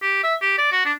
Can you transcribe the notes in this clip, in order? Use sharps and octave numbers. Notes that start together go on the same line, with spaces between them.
G4
E5
G4
D5
F#4
D4